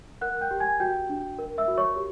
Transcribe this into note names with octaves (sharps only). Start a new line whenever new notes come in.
A#4 F#5 F#6
F#6
G5 G6
G4
G#5 G#6
F#4 G5 G6
D4
A#4
E5 E6
F#4
C#5 C#6
G4